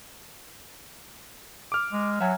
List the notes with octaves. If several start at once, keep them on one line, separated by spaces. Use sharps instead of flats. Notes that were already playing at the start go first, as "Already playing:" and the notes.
D6 F6
G#3
F#3 E5 F#5 G#5